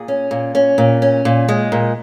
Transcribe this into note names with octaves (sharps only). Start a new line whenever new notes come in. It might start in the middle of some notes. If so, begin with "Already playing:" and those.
Already playing: A#2 G#4
C#4
A#2
C#4
A#2
C#4
A#2
G#3
A#2